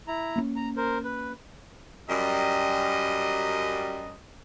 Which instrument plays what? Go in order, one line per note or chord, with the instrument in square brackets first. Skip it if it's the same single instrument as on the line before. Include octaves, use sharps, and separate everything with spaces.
[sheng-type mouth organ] E4 A#5
[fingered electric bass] A#3 B3 C#4
[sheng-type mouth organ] A#5
A#4 C5
B4
[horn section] F#2 G3 D#5